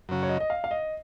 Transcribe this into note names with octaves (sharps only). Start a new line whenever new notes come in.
F#2 C#3 F#3
C#5
D#5
D#5
F5
F5
D#5